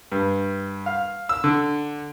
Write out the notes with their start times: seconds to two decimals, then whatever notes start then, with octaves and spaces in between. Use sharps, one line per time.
0.12 G2
0.86 F5
1.29 E6
1.44 D3